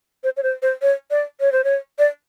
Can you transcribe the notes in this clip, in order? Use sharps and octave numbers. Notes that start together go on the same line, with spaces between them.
C5
C#5
C5
C5
C#5
D5
C#5
C5
C#5
D5